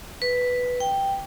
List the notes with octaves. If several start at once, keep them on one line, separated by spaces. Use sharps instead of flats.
B4
G5